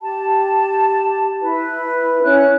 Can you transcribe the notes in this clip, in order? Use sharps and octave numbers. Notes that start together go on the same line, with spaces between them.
G4 A5
E4 B4
C#4 E4 F#6